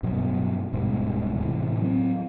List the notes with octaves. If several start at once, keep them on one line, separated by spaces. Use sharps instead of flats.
G2 B2 F#3
D1 G#2 B2 G3
A2 C3 E3
F#3 C4